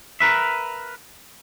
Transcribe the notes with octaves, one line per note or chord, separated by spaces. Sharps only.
A#4 B4 E5